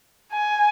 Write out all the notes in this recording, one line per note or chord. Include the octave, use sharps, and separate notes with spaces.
G#5